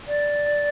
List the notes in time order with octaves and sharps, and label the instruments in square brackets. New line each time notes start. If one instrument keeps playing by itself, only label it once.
[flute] D5